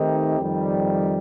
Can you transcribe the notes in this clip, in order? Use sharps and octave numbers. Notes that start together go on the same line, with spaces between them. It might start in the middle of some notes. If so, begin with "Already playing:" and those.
Already playing: D#3 A3 C4 D#4 G4
F2 D#3 G3